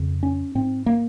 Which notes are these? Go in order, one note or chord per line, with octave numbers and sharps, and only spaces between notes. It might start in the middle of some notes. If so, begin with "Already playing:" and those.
Already playing: F2 C#3
C#4
G#2 C4
A#3